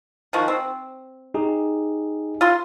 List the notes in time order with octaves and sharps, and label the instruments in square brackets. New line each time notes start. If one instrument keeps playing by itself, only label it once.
[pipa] D#3 F3 F#4
C4
[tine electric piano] D#4 G4 G#4
[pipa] F4 C6